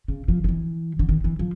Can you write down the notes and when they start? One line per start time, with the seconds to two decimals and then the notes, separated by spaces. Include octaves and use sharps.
0.08 C#3
0.28 F3
0.44 D#3
0.49 E3
0.99 D3
1.09 D#3
1.24 E3
1.39 F3